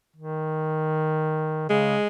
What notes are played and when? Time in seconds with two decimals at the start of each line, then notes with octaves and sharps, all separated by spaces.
0.16 D#3
1.69 C#3 G#3